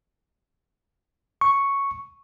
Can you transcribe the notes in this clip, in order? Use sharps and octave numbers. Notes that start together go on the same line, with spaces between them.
C#6